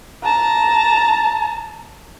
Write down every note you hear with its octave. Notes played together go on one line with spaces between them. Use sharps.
A5 A#5